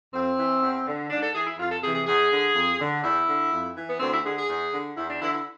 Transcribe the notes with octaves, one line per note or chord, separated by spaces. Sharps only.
F2 C4
E3
E2
D3
G#2 D4
A4
E3 G#4
E4
F2 F4
A4
C3 E3 G#4
G#4
E2 G#4
D3
F2
D3
E2 E4
D3
F2
E3
B3
D2 C4
E4
D3 G#4
G#4
E2
D3
E2 E4
D4
D3 E4
E4